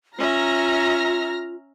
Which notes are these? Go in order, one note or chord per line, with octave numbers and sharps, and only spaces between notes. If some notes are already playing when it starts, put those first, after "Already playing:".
C#4 F4 E5 A#5 F6 A#6